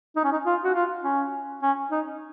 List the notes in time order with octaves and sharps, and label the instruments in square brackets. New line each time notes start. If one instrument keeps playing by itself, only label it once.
[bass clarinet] D#4
C#4
D#4
F4
F#4
F4
C#4
C#4
D#4